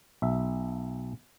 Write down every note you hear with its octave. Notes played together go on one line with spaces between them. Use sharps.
B1 E5